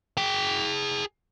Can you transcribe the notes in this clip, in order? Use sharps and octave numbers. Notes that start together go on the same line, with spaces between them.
G#4 G5